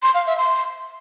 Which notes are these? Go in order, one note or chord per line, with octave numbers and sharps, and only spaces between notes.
C6
F5
E5
C6